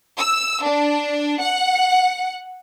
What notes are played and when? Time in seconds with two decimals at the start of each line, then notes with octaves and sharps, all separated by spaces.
0.18 E6
0.63 D4
1.41 F#5